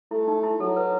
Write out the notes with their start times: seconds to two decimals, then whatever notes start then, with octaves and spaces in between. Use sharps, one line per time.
0.11 A3 E4
0.28 D#4
0.43 E4
0.60 F#3 A4
0.77 B4